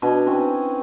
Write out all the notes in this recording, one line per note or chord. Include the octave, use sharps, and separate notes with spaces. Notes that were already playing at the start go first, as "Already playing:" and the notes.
B2 D4 G#5
E3 C4 C#4